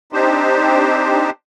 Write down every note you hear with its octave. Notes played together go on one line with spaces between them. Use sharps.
C4 D4 D#4 G4 C5